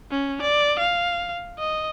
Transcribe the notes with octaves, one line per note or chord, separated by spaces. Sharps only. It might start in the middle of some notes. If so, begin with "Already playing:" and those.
C#4
D5
F5
D#5